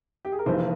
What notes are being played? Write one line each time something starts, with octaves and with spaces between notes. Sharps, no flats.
G4
G#4
A#4
F1 F2 E3 A#3 C5